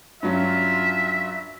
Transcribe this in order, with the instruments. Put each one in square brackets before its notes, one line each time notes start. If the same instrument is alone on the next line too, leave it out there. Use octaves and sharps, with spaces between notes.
[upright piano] G2 F#3 C#4 [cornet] F4 [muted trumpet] E5